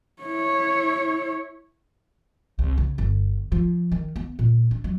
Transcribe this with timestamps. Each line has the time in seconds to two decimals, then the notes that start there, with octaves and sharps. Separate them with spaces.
0.22 E4 C#5
2.59 C2
2.78 C#3
2.98 G1
3.52 F3
3.92 D#3
4.16 B3
4.39 A#2
4.71 D4
4.84 F#3